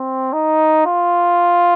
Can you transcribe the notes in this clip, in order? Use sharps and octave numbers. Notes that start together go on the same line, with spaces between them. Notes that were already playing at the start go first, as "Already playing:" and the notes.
Already playing: C4
D#4
F4